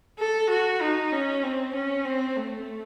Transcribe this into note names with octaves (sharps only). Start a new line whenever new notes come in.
A4
F#4
D#4
C#4
C4
C#4
C4
A3